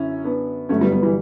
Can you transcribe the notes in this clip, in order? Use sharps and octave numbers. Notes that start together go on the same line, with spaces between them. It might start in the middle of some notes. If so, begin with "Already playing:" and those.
Already playing: F#2 D3 C#4 E4
B3 D4
G1 G2 F#3 A3 C#4
G3 B3
G3 B3
E3 G3